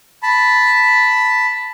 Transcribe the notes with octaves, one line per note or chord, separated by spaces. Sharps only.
A5 B5